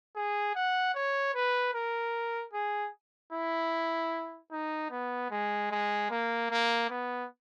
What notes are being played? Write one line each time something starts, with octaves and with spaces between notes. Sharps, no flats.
G#4
F#5
C#5
B4
A#4
G#4
E4
D#4
B3
G#3
G#3
A#3
A#3
B3